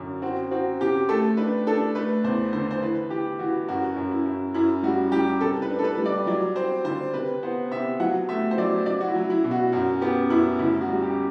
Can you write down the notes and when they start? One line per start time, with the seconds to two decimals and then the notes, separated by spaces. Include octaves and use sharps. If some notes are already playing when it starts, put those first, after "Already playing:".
Already playing: F#2 D3
0.22 C4 F#4
0.51 C4 F#4
0.80 C3 G4
1.09 A3 A4
1.37 D4 B4
1.67 D4 A4
1.95 A3 B4
2.24 E2 C5
2.53 D3 C5
2.71 C5
2.82 E3 B4
3.10 E3 G4
3.39 E3 F#4
3.68 F#2 F#4
3.96 F#2
4.11 E4
4.26 F#2
4.54 F#2 E4
4.83 G3 F#4
5.12 G3 G4
5.41 C3 A4
5.62 B4
5.70 D4
5.79 A4
5.84 B4
5.98 G3
6.06 D5
6.27 F#3 D5
6.56 C4 C5
6.84 D3 C5
7.14 C3 B4
7.43 B3 C5
7.71 C3 E5
8.00 F#3 F#5
8.29 A3 E5
8.51 C5
8.58 F#3 D5
8.86 F#3 D5
9.01 F#4
9.08 E4
9.15 F#3
9.30 E4
9.44 B2
9.51 F#4
9.72 F#2 F#4
10.01 B3 G4
10.30 F#2 E4
10.59 D2 E4
10.81 F#4
10.88 G3
11.03 G4